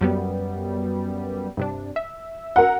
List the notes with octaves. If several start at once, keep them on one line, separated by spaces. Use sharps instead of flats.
F#2 G3 B3
G2 C3 D4
E5
A#4 F#5